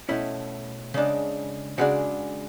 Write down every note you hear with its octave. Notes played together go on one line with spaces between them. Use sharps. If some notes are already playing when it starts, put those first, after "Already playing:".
B2 A3 C#4 E4
C#3 G#3 D4
C#3 G#3 D4 F#4 F#5